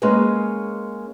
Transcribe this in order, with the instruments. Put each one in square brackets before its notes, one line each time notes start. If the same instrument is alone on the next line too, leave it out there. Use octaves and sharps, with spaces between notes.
[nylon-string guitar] G#3 A#3 C#4 G#4 B4